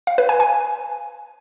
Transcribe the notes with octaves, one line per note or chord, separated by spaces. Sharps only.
F5
B4
G#5
G#5